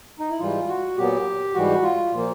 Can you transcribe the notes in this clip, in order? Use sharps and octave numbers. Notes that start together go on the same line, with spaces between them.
D#4
E4
G#2 E3 G3 F4
F#4
A#2 F#3 B3 G4
G#2 E3 G3 F#4
F4
A#2 F3 A#3